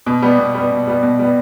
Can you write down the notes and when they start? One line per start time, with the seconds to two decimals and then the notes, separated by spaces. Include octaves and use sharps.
0.06 B2
0.22 G3 B3
0.38 B2
0.54 G3 B3
0.71 B2
0.87 G3 B3
1.03 B2
1.19 G3 B3